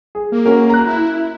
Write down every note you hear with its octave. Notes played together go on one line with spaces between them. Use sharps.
G#4
A#3
C#4 F#4 A#4
A#5 F#6
E4